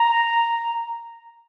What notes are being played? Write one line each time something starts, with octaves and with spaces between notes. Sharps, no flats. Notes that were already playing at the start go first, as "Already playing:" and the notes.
Already playing: A#5